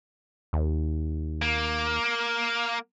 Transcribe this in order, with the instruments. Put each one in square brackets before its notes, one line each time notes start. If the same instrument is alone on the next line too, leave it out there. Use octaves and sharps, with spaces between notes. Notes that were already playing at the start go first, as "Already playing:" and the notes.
[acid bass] D#2
[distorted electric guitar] A#3